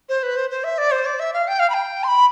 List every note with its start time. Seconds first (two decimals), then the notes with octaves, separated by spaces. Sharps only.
0.09 C5
0.23 B4
0.36 C5
0.50 C5
0.64 E5
0.78 D5
0.91 C5
1.06 D5
1.20 E5
1.33 F5
1.48 G5
1.59 F5
1.70 B5
1.74 G5
2.04 C6
2.08 B5